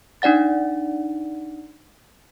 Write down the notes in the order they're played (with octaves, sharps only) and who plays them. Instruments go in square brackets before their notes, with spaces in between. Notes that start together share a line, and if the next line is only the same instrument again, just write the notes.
[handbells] D4 D#4 D5 F#5 A6